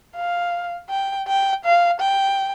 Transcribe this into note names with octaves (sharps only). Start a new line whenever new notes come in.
F5
G5
G5
F5
G5